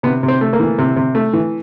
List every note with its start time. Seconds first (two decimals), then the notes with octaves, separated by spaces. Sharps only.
0.03 C3 B3
0.23 C3
0.28 C4
0.41 A3
0.53 A#3
0.60 E3
0.78 C3
0.96 C3
1.15 A3
1.33 E3